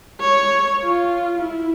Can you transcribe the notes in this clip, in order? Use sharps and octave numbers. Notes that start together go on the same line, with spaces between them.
C#5
F4
E4